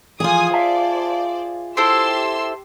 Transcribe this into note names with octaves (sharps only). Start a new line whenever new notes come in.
E3 F3 F4 G#4 G#5 D#6
C5 D5 E5 F5 A5
E4 G4 A4 C5 C6 E6